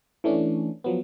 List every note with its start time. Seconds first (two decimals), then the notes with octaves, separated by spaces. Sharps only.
0.24 E3 A3 C#4 D4
0.84 F3 F#3 B3